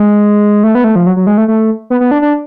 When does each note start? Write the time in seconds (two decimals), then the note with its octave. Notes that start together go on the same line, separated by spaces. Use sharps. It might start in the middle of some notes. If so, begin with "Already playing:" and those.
Already playing: G#3
0.63 A3
0.75 B3
0.84 A3
0.96 F3
1.06 F#3
1.16 F#3
1.27 G#3
1.38 A3
1.48 A3
1.90 B3
2.01 B3
2.11 D4
2.22 D4